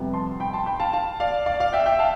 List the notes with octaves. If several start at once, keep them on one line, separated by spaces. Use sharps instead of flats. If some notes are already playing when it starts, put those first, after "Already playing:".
Already playing: F2 C3 G3 B3
A5 C6
G5 B5
A5 C6
G5 B5
F5 A5
F5 A5
D5 F5
D5 F5
D5 F5
E5 G5
E5 G5
F5 A5